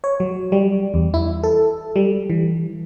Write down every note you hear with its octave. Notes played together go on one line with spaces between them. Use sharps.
C#5
F#3
G3
E2
E4
A4
G3
E3